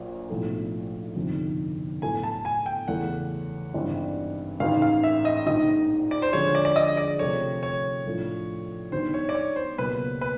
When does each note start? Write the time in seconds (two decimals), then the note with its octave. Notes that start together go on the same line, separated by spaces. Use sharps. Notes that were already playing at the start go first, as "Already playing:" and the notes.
Already playing: A#1 A#2 F#3
0.30 B1 A2 F3 A3
1.16 G1 F2 C3 D#3
2.02 A2 F#3 B3 E4 A4 G#5
2.23 A5
2.45 G#5
2.66 G5
2.88 E2 C#3 E3 A3 F#5
3.74 G#1 G2 E3 G3
4.60 A1 G#2 D#3 F5
4.82 F5
5.03 E5
5.25 D#5
5.46 A#1 G#2 D#3 D#5
6.11 D5
6.22 C5
6.33 D3 F3 G#3 C#4 F#4 C#5
6.55 D5
6.65 D5
6.76 D#5
6.97 D5
7.19 C3 F3 A3 C4 C#5
7.63 C#5
8.06 A2 F3 A3 D4 F4
8.92 G#2 D#3 G3 B3 D4 C5
9.14 C#5
9.29 D5
9.35 C#5
9.56 C5
9.78 C#2 B2 F#3 A#3 B4
10.21 B4